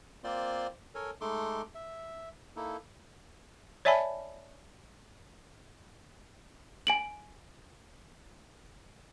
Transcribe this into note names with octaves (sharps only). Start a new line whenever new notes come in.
A#3 C4 F4 C5 D5 C6
A4 A#4 C#5 G#5
G#3 A3 D#4 A4 C6 D6
E5
A#3 D#4 E4 A4
C#5 D5 E5 G#5 A5 B5
G#5 D7 F#7